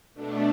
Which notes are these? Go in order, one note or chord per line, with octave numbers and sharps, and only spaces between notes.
B2 A3 D4